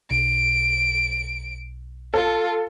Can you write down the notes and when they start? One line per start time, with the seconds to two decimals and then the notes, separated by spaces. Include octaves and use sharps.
0.11 B1 D7
2.14 F4 A4